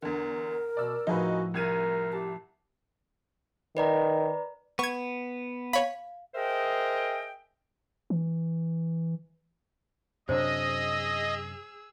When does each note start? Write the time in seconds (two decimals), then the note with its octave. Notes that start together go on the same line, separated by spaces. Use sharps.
0.02 E2 D3 A#4
0.77 B2 D5 E6
1.07 A2 F3 D#4 F#4 G#4 B4
1.54 C2 A#4 C#6 F6 G#6 A6 D#7
2.13 G4 A5
3.77 D#3 B4 D5 A#5
4.79 B3 C#6 G#6
5.73 C#5 F5 B5
6.35 G#4 A#4 C5 D#5 E5 G5
8.10 E3
10.29 F#2 C3 D4 G#4 C5 C#5 D#5 E6